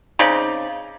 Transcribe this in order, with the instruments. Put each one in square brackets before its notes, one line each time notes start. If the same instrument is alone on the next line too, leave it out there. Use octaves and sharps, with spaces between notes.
[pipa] C#3 C4 D#4 D5